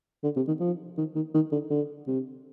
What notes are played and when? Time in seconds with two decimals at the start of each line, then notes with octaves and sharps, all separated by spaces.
0.23 D3
0.36 C3
0.47 D#3
0.60 F3
0.98 D#3
1.15 D#3
1.34 D#3
1.52 D3
1.70 D3
2.07 C3